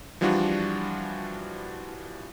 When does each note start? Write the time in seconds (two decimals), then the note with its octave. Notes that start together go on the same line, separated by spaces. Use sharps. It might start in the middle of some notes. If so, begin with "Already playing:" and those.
0.21 E3 F3 G3 D4 F4 F#4